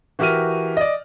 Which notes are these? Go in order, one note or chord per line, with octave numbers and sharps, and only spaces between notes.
E3 F#4 G4 A#4 F6 D#7
D5 D#5